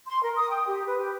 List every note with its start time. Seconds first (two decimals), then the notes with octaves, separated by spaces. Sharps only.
0.07 C6
0.22 A#4
0.37 D#6
0.50 G5
0.66 G4
0.86 B4
0.99 G4